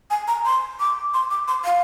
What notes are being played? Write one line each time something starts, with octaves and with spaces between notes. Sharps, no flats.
G#5
A#5
C6
D6
C6
D6
C6
F5